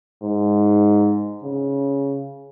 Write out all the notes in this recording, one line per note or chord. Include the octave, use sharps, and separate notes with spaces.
G#2
C#3